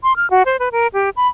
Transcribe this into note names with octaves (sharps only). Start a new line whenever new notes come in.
C6
F6
F#4
C5
B4
A#4
G4
B5